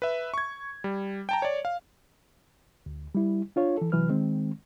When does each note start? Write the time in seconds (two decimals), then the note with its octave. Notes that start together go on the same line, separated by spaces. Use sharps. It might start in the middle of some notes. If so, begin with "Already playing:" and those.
0.02 B4 E5
0.34 C#6 G#6
0.84 G3
1.29 G5 A5 A#5
1.42 C#5 D5
1.65 F5
2.86 D2
3.15 G3 E4
3.56 D4 F4 C#5
3.77 E3 A4
3.92 C3 E3 F#3 B4 F6
4.09 D#3 G#3 C4